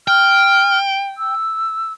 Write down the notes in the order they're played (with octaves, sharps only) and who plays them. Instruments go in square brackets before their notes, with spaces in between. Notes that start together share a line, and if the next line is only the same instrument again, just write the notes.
[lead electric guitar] G5 [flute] F6
[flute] E6